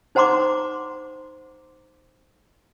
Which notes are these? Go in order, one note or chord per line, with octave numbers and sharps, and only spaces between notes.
D#4 C5 F#5 A#5 C6 D6